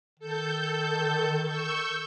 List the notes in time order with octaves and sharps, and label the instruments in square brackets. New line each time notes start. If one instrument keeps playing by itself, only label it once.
[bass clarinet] D#3 [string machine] A4 G6
[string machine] C#6 E6 G6